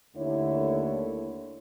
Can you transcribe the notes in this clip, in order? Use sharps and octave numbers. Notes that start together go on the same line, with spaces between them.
D#2 D3 A3 E4 A4 C#5